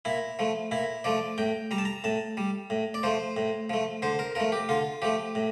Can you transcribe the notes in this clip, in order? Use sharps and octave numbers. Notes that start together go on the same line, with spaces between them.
A#2 E4
F3 A3
A#2 E4
F3 A3 D5
A2 G5
G3 A#5
A5
A#5
A2 A5
G3
A2
D5
F3 A3 C5
A2
F3 A3
D3 C5
A#4
F3 A3 A#4
G4
D3 F4
F3 A3 G4
A2